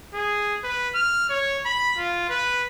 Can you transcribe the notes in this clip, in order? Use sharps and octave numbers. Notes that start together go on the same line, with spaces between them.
G#4
B4
F6
C#5
B5
F4
B4